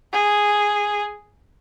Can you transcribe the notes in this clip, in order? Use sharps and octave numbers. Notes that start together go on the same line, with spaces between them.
G#4